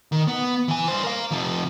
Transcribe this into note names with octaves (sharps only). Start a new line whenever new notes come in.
D#3
B3
E3 G#5
G2 C5
A#4 F5
C3 F3